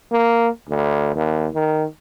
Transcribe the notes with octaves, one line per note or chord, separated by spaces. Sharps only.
A#3
D2
D#2
D#3